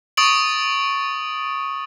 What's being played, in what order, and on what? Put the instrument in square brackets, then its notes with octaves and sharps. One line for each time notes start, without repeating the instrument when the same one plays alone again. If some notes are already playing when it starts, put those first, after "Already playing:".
[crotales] C#6 D#6 A6 D7 F#7